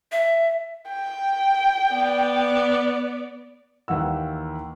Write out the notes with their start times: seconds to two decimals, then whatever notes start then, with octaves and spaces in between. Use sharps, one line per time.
0.12 E5
0.90 G5
1.92 B3 D5
3.88 D#2 E3 F#5 E6